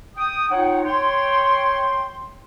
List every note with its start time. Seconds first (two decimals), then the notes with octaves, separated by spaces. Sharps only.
0.17 G5 D#6
0.50 D#4 F4 C#5 F#5 G5
0.84 C#5 G5 C6